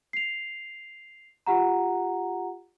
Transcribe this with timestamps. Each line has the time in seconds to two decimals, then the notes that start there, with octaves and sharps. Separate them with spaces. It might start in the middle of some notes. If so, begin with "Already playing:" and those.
0.13 C7 F7
1.46 F4 G4 F#5 A#5